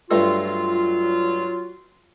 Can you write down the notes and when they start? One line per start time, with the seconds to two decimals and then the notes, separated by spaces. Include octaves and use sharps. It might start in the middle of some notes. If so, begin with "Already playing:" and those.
0.11 G2 F#3 A3 F4